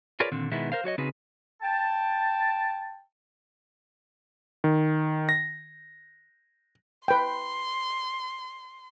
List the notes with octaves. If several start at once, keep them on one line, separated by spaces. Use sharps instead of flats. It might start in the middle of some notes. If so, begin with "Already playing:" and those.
F4 G#4 A#4 B4 C#5 D5
A#2 D3 D#3 C4
B2 D#3 G#3 B3 E4
A#4 C5 F5
F#3 F#4 C#5 D#5
C#3 C4 D#4 F#4 G#4 B4
G5 A5
D#3
A#6
B4 G5 C6